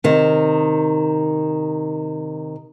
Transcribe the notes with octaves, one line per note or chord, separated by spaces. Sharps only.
C3 D#3